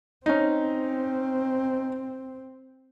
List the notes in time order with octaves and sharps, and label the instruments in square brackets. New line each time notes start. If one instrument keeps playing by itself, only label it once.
[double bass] C4 [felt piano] C#4 D#4